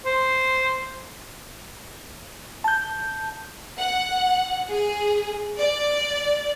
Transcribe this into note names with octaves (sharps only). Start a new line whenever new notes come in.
C5
A5 G6
F#5
G#4
D5